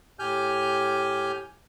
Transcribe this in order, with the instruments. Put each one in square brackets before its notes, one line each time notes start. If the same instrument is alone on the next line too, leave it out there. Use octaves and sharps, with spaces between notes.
[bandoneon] A2 G4 G#5 F6 G6